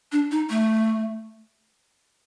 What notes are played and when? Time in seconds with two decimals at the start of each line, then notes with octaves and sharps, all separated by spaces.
0.12 D4
0.31 D#4
0.50 A3